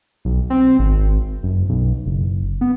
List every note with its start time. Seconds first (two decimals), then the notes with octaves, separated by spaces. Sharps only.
0.25 B1
0.50 C4
0.79 G#1
1.43 F#1
1.69 B1
2.06 F#1
2.61 B3